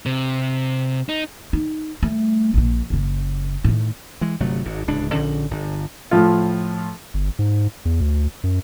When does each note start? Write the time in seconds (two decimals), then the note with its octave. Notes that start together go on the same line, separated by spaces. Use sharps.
0.06 C3
1.09 D#4
1.53 D#4
2.03 G3 A3
2.54 A#1 A#2
2.90 F#1 C#3
3.64 A2 D#3
4.21 E3 G#3
4.40 G1 C3 F#3 A3
4.65 G#1 G#2
4.87 D1 C#2 D4
5.13 A#1 D3 C#4
5.51 G1
6.11 A2 F3 F4
7.14 G1
7.39 G#2
7.85 E2
8.01 D2
8.44 F#2